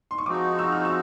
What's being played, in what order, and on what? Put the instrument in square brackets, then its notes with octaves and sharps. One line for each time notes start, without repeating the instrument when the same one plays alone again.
[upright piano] C6
C#6
[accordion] F3 G#3 C4 D#4 F#4 [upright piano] D6
[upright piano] E6
F6
E6